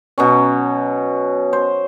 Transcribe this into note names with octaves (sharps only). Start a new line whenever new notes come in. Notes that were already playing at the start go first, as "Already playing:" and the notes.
B2 F#3 C#4
C5